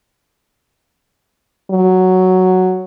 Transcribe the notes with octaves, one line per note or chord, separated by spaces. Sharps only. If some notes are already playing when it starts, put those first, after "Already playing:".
F#3